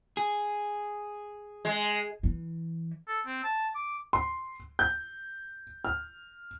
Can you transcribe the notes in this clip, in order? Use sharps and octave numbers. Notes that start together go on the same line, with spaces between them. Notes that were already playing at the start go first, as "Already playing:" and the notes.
G#4
G#3
E3
A4
C4
A5
D6
C6
G6
F6